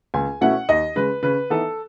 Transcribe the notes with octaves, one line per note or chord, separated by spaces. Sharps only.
C#2 G#5
B2 A3 C#4 E4 F#5
D#2 D#5
C#3 G#3 B4
C#3 B4
E3 B3 D#4 A4